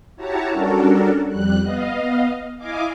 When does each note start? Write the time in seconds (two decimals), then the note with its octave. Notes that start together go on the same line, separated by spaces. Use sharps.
0.16 E4 F#4 G4 C#5 A5 A#5
0.51 G3 C#4 D4 F#4 A4 A#4
1.28 F2 G3 F#6
1.61 B3 D#5 F5
2.58 E4 D#5 F5 G#5 D6